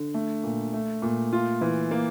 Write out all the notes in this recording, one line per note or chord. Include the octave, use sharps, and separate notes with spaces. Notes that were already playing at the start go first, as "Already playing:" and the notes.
Already playing: D3
A3
A#2
A3
A#2
F4
E3
A#3